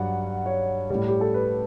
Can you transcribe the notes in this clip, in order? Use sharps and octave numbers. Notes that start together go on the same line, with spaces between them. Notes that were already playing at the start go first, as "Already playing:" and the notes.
Already playing: G2 F#3 F#5
C#5
A2 G3
G4
A4
B4